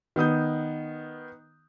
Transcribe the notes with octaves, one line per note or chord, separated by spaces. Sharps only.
D#3 B3 D#6 G6